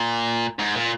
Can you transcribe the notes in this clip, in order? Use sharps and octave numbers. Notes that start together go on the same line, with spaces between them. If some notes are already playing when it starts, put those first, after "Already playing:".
Already playing: A#2
G#2
A#2